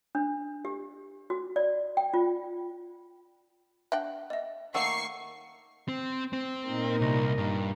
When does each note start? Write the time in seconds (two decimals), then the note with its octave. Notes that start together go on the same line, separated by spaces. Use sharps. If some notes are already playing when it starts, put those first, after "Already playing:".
0.15 D4
0.65 G4
1.30 F#4
1.56 D5
1.97 G5
2.14 F4
3.92 D4 E5 F#5 G5
4.30 D#5 E5
4.74 D#3 A3 A#3 F#5 C#6 E6 C7
5.88 C4
6.33 C4
6.68 A#2 D#4 A#4
7.01 C2
7.38 G2